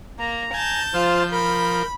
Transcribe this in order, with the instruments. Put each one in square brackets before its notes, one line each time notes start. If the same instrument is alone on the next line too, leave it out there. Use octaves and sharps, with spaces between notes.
[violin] A#3 [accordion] A#5
[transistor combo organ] G#5 [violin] A5 G6
[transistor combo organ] F3 [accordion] F4 C5 F6
[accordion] A#4 G6 [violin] B5